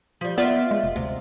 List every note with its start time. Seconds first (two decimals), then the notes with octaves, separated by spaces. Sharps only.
0.21 F3 G3
0.38 B3 F4 D5 E5
0.71 G#3
0.84 F1
0.96 D2 C3